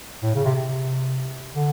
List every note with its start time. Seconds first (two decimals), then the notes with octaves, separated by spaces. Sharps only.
0.23 A2
0.35 C#3
0.45 C3
0.56 C3
1.54 D3